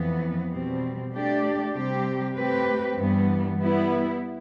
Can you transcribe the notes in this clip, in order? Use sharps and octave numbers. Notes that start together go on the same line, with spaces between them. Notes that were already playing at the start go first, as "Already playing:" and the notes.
Already playing: F2 E3 B3
B2 G3 C4
A3 D4 G4 D5
C3 G3 C4 G4
A3 C4 G4 B4
G2 E3 G3 B3
G3 B3 E4